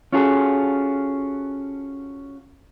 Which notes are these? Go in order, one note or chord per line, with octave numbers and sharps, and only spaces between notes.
C#4 F4 F#4 G#4 A4